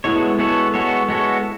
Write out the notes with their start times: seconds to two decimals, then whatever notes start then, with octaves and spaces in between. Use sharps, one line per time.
0.04 G#3 B3 E4 F#4 A4 C#5
0.39 G#3 B3 F#4 A4 C#5
0.74 G#3 B3 F#4 A4 C#5
1.09 G#3 B3 F#4 A4 C#5